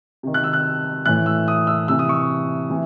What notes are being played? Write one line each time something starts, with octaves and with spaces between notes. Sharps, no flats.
C3 D#3
F#6
E6
F#6
A2 E3 F#6
E6
D#6
E6
C3 E3 E6
D#6
C#6
C3 E3